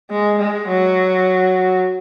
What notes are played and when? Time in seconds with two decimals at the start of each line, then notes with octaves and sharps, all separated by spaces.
0.11 G#3
0.39 G#3
0.68 F#3